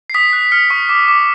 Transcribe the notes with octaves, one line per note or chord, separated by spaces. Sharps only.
C7
D#6 B6
F#6
F6 C#7
C#6
D6
D6